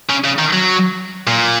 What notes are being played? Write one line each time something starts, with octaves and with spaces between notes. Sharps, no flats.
C#3
C#3
D#3
F#3
A#2